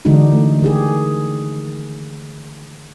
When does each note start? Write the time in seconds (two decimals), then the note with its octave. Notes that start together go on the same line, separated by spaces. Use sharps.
0.05 D3 E3 G#3 D4 D#4 F#4
0.32 A3
0.62 D#3 G4 G#4